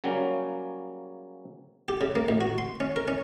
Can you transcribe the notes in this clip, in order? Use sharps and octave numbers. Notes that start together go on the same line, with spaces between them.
C#3 F#3 G3 A#3 C#4
G4
C#3
A#3
A1
F#4
C6
C#4
A#4
C#4